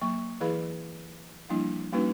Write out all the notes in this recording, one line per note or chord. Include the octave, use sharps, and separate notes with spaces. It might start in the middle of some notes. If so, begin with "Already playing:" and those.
F#3 A#3 C#6
E3 E4 G#4 B4 F5 B5
F3 G3 A#3 D4 E4
G3 A#3 C#4 D#4 F#4 B4